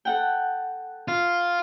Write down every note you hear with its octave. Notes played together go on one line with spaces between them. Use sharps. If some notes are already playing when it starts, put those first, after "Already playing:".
A4 F#5 G5
F4